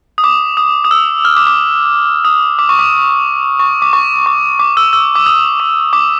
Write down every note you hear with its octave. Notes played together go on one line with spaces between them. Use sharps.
D#6
D6
D#6
D#6
E6
F6
D6
D6
D#6
D6
C#6
D6
C#6
D6
C#6
C#6
D6
E6
E6
D6
D#6
D6
D6